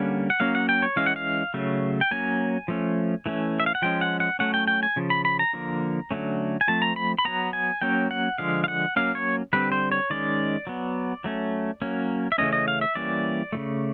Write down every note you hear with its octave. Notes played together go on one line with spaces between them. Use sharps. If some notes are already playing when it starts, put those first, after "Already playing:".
Already playing: D3 G3 A#3 C#4 F#5
F#5
F#3 A#3 C#4 F5
F#5
G5
C#5
E3 G#3 C#4 F5
F#5
F5
C#3 F#3 A3
G5
F#3 A#3 C#4 G#5
F3 A3 C#4
E3 A3 C#4
E5
F5
F#5
F3 G#3 C#4 G5
F#5
F#5
F#3 A3 C#4 F#5
G5
G5
G#5
C#3 F3
B5
B5
A#5
D3 F3 A#3
D3 F#3 A3 C#4
G#5
F3 A3 C4 A5
A#5
B5
B5
F#3 B3 A#5
G#5
F#3 A#3 C#4 G5
F#5
D3 F3 G#3 F5
F5
F#5
F#3 A#3 C#4 F5
C#5
D3 G3 C4 B4
C5
C#5
D#3 G#3 C#4 D5
F#3 B3
F#3 A3 C#4
F#3 A#3 C#4
E5
C#3 E3 A3 C#4 D#5
D#5
F5
E5
E3 G3 A#3 C#4 D5
C#3 F3 A3